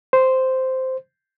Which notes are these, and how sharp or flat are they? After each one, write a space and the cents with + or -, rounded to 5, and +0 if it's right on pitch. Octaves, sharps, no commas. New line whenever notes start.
C5 -5